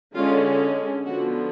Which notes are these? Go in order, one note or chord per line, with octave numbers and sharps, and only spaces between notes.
D3 G#3 C#4 F4
D3 F3 B3 F#4